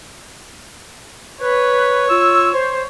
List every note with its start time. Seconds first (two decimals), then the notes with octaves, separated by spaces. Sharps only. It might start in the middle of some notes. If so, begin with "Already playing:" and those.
1.41 B4 C#5
2.09 F4 E6
2.53 C5